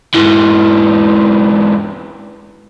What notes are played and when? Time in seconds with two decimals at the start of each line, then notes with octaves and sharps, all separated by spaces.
0.15 G#2 E3